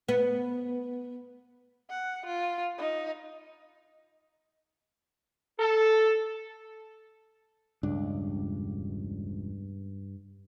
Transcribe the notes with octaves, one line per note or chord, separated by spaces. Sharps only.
B3
F#5
F4
D#4
A4
E1 C#2 G2 D4